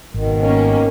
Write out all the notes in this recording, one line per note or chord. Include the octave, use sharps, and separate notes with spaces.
G#1 B2 D#3
A#3 C#4